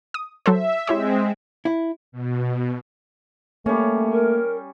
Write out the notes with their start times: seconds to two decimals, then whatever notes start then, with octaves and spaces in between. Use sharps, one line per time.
0.14 D#6
0.46 F#3 A4 C5 E5
0.87 G#3 C4 E4 G4 C#5
1.65 E4
2.12 B2
3.66 G3 A3 A#3 C#4
4.12 A#4